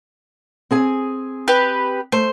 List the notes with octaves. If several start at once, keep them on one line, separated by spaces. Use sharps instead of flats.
C4 G#4 G#5
G4 B4
A3 C5